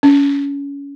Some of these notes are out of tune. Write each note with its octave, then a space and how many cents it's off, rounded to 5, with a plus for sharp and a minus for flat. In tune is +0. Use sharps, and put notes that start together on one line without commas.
C#4 +25